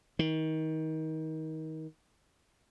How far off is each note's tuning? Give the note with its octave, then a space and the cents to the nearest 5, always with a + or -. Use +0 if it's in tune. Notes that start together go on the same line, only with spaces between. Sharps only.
D#3 +25